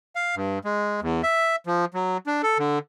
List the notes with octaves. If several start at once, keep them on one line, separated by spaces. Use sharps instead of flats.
F5
G2
G#3
E2
E5
F3
F#3
D4
A4
D3